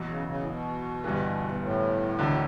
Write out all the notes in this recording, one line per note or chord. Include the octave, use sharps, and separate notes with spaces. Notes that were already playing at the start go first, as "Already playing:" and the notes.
Already playing: E2 B2 F#3
C#3
C#3
A2
B2
G1 G2 E3 B3
G2
A2
E1 D2 D3